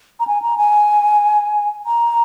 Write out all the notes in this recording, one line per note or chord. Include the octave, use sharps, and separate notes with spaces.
A#5
G#5
A#5
G#5
A#5